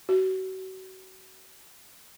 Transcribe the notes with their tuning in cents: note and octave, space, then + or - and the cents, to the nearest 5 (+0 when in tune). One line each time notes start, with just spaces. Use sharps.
F#4 +30